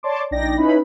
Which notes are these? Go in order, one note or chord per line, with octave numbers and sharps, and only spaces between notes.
C#5 D5 A5 C6 D6
A#1 D4 D#4 D5 G5 A#6
C#4 D#4 E4 B4 B5